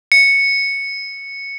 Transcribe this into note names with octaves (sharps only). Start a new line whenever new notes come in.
C#7